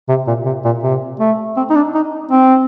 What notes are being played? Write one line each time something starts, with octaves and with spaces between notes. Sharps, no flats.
C3
A#2
C3
A#2
C3
A3
C4
D#4
D4
D#4
C4